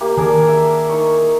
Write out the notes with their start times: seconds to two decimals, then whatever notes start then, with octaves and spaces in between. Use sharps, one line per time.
0.01 A#3 G4
0.17 D#3 D4 G#4 A#4
0.47 E5
0.89 D#4 C#6